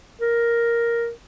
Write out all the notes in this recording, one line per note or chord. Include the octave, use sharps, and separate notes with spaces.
A#4